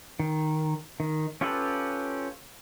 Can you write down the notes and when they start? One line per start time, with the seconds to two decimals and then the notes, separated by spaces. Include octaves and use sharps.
0.20 D#3
1.00 D#3
1.41 C#4 F4 G4 A4 B4